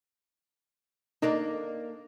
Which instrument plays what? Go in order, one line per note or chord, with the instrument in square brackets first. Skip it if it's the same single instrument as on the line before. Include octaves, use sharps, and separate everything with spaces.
[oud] A#3 D4 A#4 [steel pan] D#4